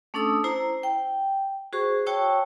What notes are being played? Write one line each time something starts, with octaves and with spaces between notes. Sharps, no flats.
A3 C#4 D4 A4 D#6 E6
E4 C5 A#5
G5
F#4 G#4 C5 C#6
F#4 C#5 G5 A5 C#6 E6